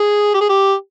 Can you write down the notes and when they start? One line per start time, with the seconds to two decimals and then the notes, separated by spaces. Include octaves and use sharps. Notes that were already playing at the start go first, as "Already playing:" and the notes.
Already playing: G#4
0.34 G4
0.41 G#4
0.49 G4